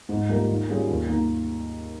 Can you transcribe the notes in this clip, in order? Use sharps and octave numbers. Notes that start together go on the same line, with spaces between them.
G#2
G3 A#3 F4 A#4
D#3
G3 C#4 F4 G#4
D#2
D#3 A#3